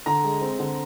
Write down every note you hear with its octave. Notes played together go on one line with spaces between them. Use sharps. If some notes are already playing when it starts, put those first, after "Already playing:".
D3 A#5
G#3
C4
D3